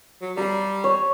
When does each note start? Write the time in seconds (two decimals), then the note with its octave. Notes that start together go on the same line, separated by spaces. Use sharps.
0.22 F#3
0.37 G3 A#5 C6
0.84 C#5